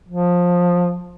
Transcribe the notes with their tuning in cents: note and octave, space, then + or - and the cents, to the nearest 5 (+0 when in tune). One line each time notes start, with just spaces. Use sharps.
F3 +15